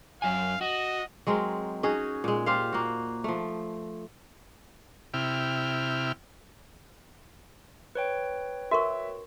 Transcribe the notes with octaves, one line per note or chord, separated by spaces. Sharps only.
F#2 F#3 F5 G#5
F#4 D#5
F#3 G#3 C4 A#4
C#4 D#4 F#4 G#4
A#2 G#3
F4 G4 C5 F5
A#3 F#4
F3 A3
C3 E4 G5 F6
B4 C#5 G5
F#4 A#4 E5 C#6